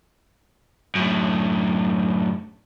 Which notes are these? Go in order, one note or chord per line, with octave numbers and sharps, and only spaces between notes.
F#2 A2